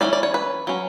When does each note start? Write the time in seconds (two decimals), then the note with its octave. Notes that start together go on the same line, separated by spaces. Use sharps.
0.01 E3 A3 C#4 D5
0.13 D5
0.23 C#5
0.34 B4
0.67 F#3 C#4